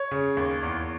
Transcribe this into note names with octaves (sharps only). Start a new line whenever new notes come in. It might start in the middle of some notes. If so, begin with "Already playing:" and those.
Already playing: C#5
C#3
D#2
E2